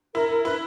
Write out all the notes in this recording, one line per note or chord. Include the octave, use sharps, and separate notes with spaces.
E4 A#4
A#4
E4 B4